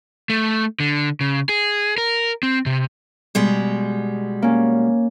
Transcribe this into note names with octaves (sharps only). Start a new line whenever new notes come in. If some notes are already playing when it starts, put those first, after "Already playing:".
A3
D3
C#3
G#4
A#4
C4
C3
B2 G3 G#3
A#3 C#4